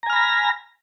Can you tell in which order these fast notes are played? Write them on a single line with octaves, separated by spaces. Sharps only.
A#5 G#5 F6 B5 A#6